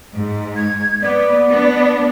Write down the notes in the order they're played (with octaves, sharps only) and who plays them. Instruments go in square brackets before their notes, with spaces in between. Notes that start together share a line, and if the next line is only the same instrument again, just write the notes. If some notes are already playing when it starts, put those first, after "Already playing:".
[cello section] G#2
[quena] G#6
[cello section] B3 [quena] D5
[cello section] B3 D4